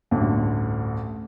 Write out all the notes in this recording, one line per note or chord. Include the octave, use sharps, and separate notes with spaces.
A1 D2 G2